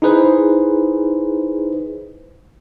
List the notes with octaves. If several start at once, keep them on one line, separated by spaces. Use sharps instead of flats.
D#4 E4 G#4 B4 C5